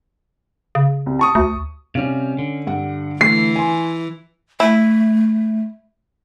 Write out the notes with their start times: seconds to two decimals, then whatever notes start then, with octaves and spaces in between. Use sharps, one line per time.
0.75 C#3
1.06 C2
1.19 A5 C#6 D#6
1.35 D2
1.95 C3 G3 C#4 F5
2.39 D3
2.67 G2 F#5
3.21 E3 A3 C7
3.56 G#5 C6
4.60 A3 E4